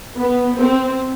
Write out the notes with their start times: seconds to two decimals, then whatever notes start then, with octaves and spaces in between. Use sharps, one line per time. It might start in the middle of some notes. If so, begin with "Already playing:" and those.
0.17 B3
0.56 C4